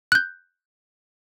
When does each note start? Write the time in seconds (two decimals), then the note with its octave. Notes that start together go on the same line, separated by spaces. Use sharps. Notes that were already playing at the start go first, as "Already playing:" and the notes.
0.12 F#6 G6